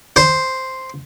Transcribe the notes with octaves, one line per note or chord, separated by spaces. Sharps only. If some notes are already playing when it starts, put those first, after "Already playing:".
C5